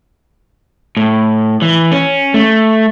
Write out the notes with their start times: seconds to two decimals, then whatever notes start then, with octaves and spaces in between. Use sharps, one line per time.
0.97 A2
1.62 E3
1.92 C#4
2.34 A3